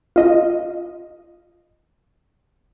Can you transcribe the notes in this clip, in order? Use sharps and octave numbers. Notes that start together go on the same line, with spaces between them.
F4 D#5